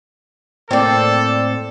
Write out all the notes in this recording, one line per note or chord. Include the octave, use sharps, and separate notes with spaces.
A2 A#3 C4 A4 D5